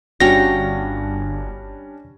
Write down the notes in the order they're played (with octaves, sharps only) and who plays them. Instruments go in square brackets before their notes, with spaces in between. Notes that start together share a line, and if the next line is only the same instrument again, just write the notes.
[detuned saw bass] G1 [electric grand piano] G3 C#4 D4 [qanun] F#4 F5 G5 [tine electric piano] A#6